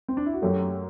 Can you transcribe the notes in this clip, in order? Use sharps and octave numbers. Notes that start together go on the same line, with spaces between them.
C4
D4
E4
F#4
F#2 F#3 A3 G4